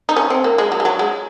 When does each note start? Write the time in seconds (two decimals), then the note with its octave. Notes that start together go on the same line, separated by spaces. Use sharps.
0.09 D#4
0.17 C#4
0.30 C4
0.44 A#3
0.58 G#3
0.72 F#3
0.80 G#3
0.85 F#3
0.99 G#3